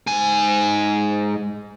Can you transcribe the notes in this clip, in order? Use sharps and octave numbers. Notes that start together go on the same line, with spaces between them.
G#2 G#5